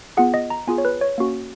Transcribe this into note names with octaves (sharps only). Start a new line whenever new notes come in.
B3 F4 G#4 F#5
D#5
A#5
B3 F4 G#4 G#5
C#5
B4
C#5
A#3 C#4 F#4